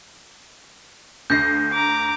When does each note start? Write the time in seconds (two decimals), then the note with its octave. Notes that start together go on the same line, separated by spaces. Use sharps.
1.30 D2 G6 A#6 C7
1.72 A#5 D6